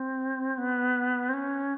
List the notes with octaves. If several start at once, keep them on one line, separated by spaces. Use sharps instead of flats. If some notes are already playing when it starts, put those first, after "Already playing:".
Already playing: C4
B3
C4
C#4